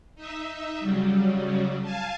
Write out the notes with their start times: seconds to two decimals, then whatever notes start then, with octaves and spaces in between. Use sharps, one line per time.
0.15 D#4 E5
0.80 C#3 F#3 G3
1.82 F5 G#5 A5